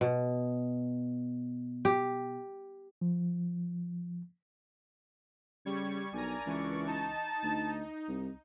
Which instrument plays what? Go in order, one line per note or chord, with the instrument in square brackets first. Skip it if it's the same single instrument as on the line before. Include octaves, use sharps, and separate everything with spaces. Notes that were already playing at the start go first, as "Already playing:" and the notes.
[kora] B2
G4
[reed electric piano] F3
[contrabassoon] C#3 [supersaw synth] G3 C#6 G#6
[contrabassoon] B1 [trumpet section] D4 A#4 D5 [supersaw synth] G#5 A#5
[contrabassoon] C#2 [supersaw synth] E3 C#6
[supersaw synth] D#4 [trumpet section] A5
[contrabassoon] D2
C2